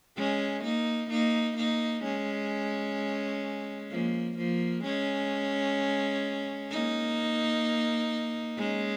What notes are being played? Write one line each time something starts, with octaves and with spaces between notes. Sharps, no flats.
G#3 C#4
A#3 D#4
A#3 D#4
A#3 D#4
G#3 C#4
F3 A#3
F3 A#3
G#3 C#4
A#3 D#4
G#3 C#4